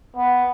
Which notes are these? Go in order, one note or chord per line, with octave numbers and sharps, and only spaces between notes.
B3